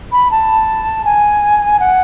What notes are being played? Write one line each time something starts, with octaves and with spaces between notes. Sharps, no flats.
B5
A5
G#5
F#5